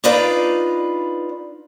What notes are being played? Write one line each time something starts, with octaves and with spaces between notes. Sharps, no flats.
D4 D#4 F4 B4 D5